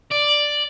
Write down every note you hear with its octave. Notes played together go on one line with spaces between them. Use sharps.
D5